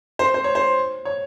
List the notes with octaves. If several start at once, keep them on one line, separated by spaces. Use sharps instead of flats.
C5
C5
C#5
C5
C#5